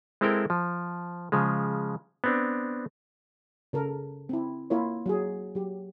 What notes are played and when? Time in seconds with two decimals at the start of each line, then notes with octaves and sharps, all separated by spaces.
0.21 G#3 C4 E4 A4 A#4 G5
0.50 F3
1.32 C#3 F3 G#3
2.24 B3 C4 D4
3.73 C#3 A4 A#4
4.29 C4 E4
4.70 A#3 E4 F4 A#4 C#5
5.06 F#3 G#4
5.55 F#3 G4